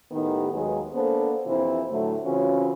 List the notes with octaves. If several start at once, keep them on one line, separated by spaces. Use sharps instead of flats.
A2 D#3 B3 D#4 G4
D#2 F#3 G#3 A#3 G#4 B4
A#3 B3 D4 A4 C5
F2 C3 E3 E4 C5
A2 D3 F#3 A3
C#3 E3 C4 C#4 F4 F#4